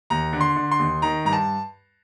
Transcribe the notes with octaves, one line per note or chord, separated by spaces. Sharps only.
D#2 A#5
D3
C6
D3
C6
D#2
D#3 A#5
G2 A#5
A5